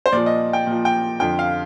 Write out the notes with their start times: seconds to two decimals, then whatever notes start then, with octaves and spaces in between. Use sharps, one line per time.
0.06 C5
0.12 A#2 F3 D5
0.26 D#5
0.53 G5
0.67 A#2 F3
0.85 G5
1.20 F2 D3 F3 G5
1.39 F5